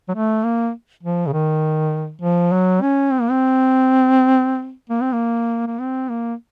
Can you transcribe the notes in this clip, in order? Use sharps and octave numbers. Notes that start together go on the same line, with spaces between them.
F#3
A3
A#3
F3
C#3
D#3
F3
F#3
C#4
C4
A#3
C4
A#3
C4
A#3
A#3
C4
A#3